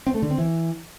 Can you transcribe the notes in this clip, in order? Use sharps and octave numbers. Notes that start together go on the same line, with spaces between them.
C4
A3
D3
C4
E3